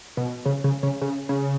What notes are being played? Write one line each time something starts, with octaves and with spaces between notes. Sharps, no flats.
B2
C#3
C#3
C#3
C#3
C#3